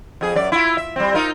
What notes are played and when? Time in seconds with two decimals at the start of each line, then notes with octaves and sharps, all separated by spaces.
0.21 F2 G#4
0.35 F#2 D5
0.52 E4 F4
0.77 E5
0.96 G3 C4
1.14 D#4 F4 A#4